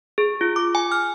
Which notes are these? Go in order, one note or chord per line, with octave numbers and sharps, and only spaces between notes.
G#4
F4
D6
G#5
F6